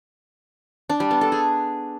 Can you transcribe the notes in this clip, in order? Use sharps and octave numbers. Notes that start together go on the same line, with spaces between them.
D4
G3
B3
A4
G#4